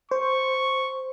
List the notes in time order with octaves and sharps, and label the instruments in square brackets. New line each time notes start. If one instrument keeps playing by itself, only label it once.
[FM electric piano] C5 [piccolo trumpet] C#6